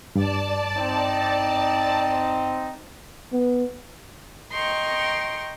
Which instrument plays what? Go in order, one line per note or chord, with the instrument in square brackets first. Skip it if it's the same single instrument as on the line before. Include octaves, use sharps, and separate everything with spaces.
[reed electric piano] G2 [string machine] D5 A5
[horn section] C4 D#4
[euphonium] B3
[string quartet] D#5 G5 A#5 C6 C#6